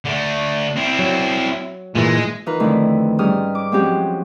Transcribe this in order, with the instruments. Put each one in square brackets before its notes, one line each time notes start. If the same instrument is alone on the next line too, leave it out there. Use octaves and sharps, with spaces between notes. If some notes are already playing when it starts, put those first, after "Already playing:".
[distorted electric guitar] D3 A3
C4 E4
[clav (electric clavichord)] F#3
[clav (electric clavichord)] A#2 E3 [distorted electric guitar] G#3
[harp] E3 D#4 F4 A#4 B4
F2 D3 D#3 A3 E4
G#2 G3 C#4 D#6 F6
D6
F3 F#3 G#3 C4 C#4 G4